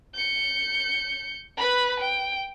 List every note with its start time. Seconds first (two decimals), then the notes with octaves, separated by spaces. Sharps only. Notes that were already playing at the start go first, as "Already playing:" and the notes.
0.14 G6 C#7
1.57 B4 B5
2.00 G5